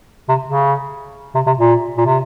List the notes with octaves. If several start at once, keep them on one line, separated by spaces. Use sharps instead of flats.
C3
C#3
C3
C3
A#2
A#2
C3